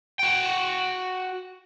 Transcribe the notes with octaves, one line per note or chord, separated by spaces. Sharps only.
F#4 G5